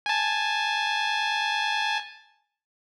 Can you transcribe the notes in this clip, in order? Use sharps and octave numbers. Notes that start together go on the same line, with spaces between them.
G#5 A5